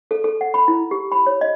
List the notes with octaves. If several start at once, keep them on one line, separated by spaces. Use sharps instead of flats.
A4
A4
F#5
B5
E4
G4
B5
C#5
D#5